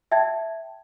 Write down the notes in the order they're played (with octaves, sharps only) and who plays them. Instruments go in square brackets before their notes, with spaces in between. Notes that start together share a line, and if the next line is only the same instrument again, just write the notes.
[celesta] E5 G5 A5 G#6